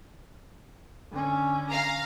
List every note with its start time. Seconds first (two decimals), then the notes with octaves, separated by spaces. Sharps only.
1.12 D3 C#4
1.68 F5 A#5